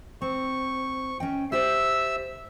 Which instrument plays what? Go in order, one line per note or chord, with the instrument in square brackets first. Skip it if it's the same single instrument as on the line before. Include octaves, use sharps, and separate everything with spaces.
[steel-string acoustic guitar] C4 [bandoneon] C#6
[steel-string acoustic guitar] C#4 D#5 G5
[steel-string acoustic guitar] G4 C5 D5 [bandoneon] E5 E6